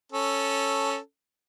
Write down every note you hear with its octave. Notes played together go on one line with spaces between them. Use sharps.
C#4 A4